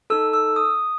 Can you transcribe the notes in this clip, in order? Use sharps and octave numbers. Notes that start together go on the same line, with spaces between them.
D#4 A4 E6
E6
D#6